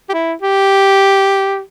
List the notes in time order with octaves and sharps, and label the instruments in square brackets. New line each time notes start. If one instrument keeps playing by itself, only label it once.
[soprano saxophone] G4
E4
G4